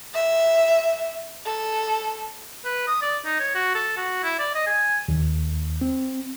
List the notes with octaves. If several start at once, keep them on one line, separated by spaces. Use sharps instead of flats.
E5
A4
B4
D#6
D5
D#4
C#5
F#4
A4
F#4
E4
D5
D#5
G#5
D#2
C4